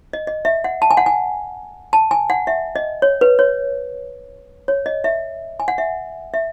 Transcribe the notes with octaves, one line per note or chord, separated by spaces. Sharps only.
D#5
D#5
E5
F#5
A5
G#5
F#5
G#5
A5
G#5
F#5
E5
D#5
C#5
B4
C#5
C#5
D#5
E5
G#5
F#5
E5
E5